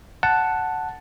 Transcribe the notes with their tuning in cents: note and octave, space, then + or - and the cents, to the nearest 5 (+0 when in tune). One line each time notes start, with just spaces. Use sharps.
F#5 +0 A5 +0